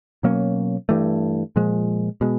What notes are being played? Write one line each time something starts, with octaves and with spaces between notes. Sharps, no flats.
B2 F#3 A#3 C#4
G2 E3 A3
A#2 F3 G#3
B2 G#3